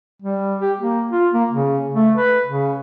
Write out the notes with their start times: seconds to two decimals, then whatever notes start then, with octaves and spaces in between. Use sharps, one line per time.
0.22 G3
0.61 G4
0.80 A#3
1.11 F4
1.34 A#3
1.51 C#3
1.95 A3
2.16 B4
2.46 C#3